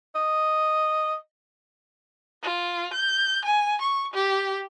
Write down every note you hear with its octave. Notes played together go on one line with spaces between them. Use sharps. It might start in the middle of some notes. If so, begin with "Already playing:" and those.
D#5
F4
G6
G#5
C#6
G4